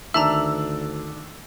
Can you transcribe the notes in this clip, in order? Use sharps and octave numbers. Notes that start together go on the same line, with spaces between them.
D2 D#3 D4 E5 A5 A#5 E6 F#7